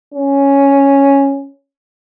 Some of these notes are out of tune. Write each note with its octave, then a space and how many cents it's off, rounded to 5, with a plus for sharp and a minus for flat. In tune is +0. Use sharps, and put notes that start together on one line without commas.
C#4 +0